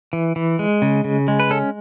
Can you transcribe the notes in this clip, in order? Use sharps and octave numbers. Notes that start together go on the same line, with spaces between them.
E3
E3
G#3
C#3
C#3
G#3
B4
C#4 A4